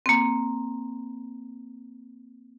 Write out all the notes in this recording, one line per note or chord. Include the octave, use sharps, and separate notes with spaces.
A#3 C4